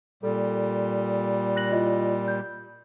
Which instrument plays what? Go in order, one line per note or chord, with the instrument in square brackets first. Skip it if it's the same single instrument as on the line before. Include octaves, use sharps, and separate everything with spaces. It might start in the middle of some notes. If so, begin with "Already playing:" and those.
[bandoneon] A#2 G3 [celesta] A4
[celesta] F#6 A#6 F#7
E4 F4 D#5
G6